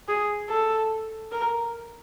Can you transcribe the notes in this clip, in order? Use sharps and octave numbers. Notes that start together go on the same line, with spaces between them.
G#4
A4
A#4